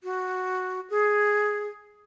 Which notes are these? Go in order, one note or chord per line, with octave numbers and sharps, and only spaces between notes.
F#4
G#4